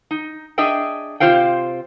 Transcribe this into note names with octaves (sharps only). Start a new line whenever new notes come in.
D#4
D4 G#4 D#5 E5 G5
C3 G#3 F4 C5 F5 G5